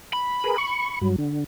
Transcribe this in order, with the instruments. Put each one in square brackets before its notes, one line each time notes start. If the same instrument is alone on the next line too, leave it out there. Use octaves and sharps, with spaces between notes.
[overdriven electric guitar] B5
[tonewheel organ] G#4 A#4 B4
C#6
G2 F#3
D3